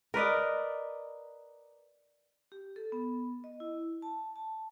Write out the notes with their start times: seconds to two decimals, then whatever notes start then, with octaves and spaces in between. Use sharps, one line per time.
0.14 A#4 B4 D5 D#5
2.52 G4
2.76 A4
2.92 B3
3.44 D#5
3.60 E4
4.02 A5
4.36 A5